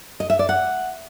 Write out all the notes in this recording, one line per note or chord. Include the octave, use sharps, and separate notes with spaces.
D#5
E5
D5
F#5